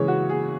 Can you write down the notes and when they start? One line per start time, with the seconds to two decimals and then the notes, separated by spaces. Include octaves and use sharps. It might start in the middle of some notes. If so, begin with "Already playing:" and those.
Already playing: C#3 E3 G#3 C#5
0.08 F#4
0.29 G#4